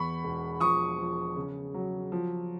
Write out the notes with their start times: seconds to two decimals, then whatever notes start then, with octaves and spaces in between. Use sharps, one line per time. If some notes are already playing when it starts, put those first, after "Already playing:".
Already playing: E2 B5 C#6
0.24 E1
0.60 F3 C#6 D#6
0.99 F3
1.36 C#3
1.74 F#3
2.12 F3